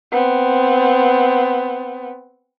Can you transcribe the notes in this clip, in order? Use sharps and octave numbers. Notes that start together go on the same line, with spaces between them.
B3 C4